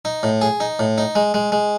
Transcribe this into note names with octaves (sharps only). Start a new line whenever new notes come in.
D#4
A2
G#4
D#4
A2
D#4
G#3
G#3
G#3